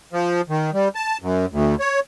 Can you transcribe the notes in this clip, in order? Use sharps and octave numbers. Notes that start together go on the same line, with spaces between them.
F3
D#3
G3
A5
F#2
D2
C#5